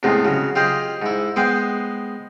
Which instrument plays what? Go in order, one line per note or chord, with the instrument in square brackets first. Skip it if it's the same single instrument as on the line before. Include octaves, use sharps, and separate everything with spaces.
[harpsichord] E2 A2 C3 G#3 B3
C#3 F#3
F4 G4 G#4 C5 D#5
G#2 E4
G#3 B3 B4 C5 G5